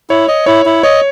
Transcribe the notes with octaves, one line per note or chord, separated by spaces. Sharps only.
E4 C#5
D#5
E4 C#5
E4
C#5 D#5